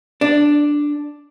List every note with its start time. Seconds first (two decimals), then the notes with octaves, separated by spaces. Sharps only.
0.21 D4